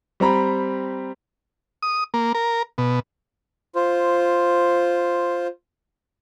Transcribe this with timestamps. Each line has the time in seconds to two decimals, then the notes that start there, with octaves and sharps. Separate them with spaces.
0.20 G3 C4 A#5 B5
1.83 D#6
2.14 A#3
2.35 A#4
2.78 B2
3.75 F4 C5